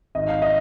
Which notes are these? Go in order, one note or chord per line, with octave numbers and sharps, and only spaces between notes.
G#1 D#5
F5
D#5